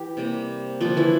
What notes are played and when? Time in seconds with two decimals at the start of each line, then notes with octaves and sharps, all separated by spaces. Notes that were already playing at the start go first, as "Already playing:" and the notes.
Already playing: E3 G4
0.17 C3 G3 A#3
0.81 D3 F3 G3 A#3 F4
0.97 E3 E4